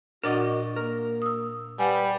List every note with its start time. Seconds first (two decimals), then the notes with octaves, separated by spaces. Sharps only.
0.24 A#2 D4 F#4 A#4 D5 D#5
0.76 A#3 A#4
1.22 D#6 E6
1.79 G3 B4 F#5 G#5